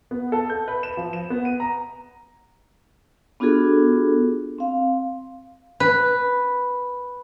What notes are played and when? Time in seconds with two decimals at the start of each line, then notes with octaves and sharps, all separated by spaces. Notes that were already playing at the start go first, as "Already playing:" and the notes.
0.11 B3
0.32 A4
0.50 G6
0.68 B4
0.83 E7
0.97 F3
1.13 E7
1.30 B3
1.45 D#7
1.60 A#5
3.40 B3 D4 F4 F#4 G#4 A4
4.58 C4 F5
5.80 B4